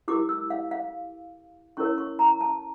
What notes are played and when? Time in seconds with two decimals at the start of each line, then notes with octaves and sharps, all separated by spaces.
0.08 E4 G4 A#4 D6
0.29 E6
0.50 F5
0.71 F5
1.77 C#4 E4 A#4 C#5 C#6
1.98 C#6
2.19 A#5
2.41 A5